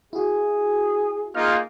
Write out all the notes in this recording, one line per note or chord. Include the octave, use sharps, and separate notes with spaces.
E4 F#4 G#4
A#3 D#4 F4 G#4 F6